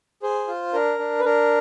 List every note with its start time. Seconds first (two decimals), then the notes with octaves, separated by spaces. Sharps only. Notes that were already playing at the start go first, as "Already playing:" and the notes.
0.23 G#4 C5
0.48 F4
0.73 D4 A#4
0.99 D4
1.20 B4
1.24 D4 A#4